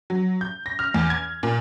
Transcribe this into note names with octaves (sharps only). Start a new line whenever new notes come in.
F#3
G6
A#6
F6
E2
G#6
A#2